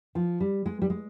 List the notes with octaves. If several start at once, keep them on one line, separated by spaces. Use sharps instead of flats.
F3
G3
G#3
G3
G#3